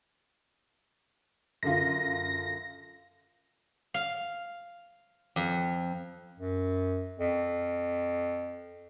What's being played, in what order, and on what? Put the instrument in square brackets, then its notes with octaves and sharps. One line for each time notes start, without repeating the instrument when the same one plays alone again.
[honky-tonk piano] F#2 D3 F4 [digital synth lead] A#6
[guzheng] F5
F2
[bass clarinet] F#2
F2